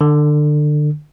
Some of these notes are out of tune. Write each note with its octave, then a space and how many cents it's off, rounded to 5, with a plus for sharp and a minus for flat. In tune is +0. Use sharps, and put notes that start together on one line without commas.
D3 +25